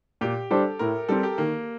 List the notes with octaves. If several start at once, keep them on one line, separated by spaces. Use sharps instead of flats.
A#2 G4
G3 D4 G4 A4 C5
A2 A#4
G3 C4 A4
G4
D#3 A#3